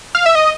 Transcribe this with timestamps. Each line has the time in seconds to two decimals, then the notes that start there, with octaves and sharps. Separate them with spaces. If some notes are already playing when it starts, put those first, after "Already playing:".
0.15 F5
0.26 E5
0.35 D#5